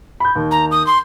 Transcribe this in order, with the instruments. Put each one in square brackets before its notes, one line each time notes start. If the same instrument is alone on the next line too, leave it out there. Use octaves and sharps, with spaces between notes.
[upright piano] B5 G6
D#2
[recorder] A#5
D#6
C6